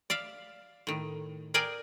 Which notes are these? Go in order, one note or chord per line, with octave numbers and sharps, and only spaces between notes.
D5 E5 F5
A2 D#3
G#4 A#4 D5 G5 G#5